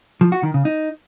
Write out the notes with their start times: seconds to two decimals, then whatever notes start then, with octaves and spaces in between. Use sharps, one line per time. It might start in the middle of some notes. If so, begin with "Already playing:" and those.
0.21 F3
0.32 F#4
0.43 D#3
0.54 C#3
0.65 D#4